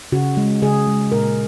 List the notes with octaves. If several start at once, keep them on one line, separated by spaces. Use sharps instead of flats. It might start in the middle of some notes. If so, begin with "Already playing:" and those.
C#3 F#4
G#3
C#3 G#4
G#3
A#2 A#4